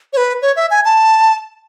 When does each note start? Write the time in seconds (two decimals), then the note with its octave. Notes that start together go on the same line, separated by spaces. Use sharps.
0.13 C#5
0.17 B4
0.42 C#5
0.56 E5
0.71 G#5
0.85 A5